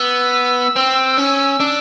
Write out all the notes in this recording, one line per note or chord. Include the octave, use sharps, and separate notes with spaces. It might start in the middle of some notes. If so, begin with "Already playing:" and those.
Already playing: B3 E6
C4
C#4
D4